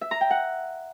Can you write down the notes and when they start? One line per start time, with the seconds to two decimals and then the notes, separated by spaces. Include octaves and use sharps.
0.01 E5
0.11 A#5
0.21 G5
0.30 F#5